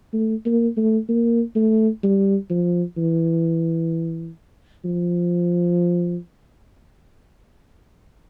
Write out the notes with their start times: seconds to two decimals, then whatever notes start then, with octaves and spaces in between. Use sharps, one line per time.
0.13 A3
0.46 A#3
0.77 A3
1.09 A#3
1.55 A3
2.03 G3
2.50 F3
2.97 E3
4.85 F3